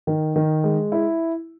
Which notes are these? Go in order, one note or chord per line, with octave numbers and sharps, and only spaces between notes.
D#3
D#3
G#3
E4